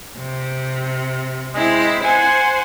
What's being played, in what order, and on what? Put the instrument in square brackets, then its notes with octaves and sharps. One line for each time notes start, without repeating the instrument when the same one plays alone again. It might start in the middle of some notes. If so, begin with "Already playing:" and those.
[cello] C3
[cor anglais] G#3 [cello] C4 E4
[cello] C5 F#5 [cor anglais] G#5